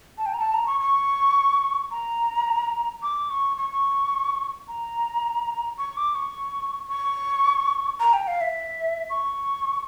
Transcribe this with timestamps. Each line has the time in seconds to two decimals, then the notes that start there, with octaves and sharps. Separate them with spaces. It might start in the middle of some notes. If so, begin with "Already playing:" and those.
0.18 A5
0.26 G5
0.34 A#5
0.40 A5
0.54 A#5
0.67 C#6
0.81 C#6
1.91 A#5
3.03 D6
3.30 C#6
3.57 C#6
4.68 A#5
5.78 C#6
5.97 D6
6.15 C#6
6.89 C#6
8.00 A#5
8.13 G5
8.28 F5
8.41 E5
9.10 C#6